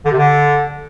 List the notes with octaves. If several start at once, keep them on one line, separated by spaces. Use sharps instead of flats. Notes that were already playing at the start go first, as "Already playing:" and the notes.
D3
C3
D3